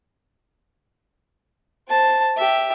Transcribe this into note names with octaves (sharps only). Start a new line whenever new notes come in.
C5 A5
G4 E5